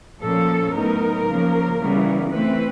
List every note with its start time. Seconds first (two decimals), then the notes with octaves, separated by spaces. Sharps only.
0.20 A#2 F3 A#3 C#4 A4
0.74 A2 F#3 B3 D#4 A#4
1.26 C#3 F3 A#3
1.79 C#3 E3 G3 B3
2.31 E3 A3 C4 B4